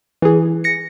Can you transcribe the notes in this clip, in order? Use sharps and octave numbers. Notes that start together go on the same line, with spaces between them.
E3 G#4
A#6 C#7